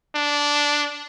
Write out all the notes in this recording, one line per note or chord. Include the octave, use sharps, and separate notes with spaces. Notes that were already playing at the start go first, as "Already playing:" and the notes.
D4